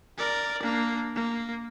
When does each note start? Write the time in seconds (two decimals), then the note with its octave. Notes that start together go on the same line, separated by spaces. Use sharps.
0.18 A#4 D5
0.63 A#3 D4
1.15 A#3